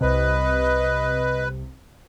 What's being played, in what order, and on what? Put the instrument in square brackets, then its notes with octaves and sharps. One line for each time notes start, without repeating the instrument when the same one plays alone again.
[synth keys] C2 C3 [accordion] B4 [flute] D#5